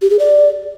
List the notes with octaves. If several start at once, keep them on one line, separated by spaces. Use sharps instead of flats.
G4
G#4
D5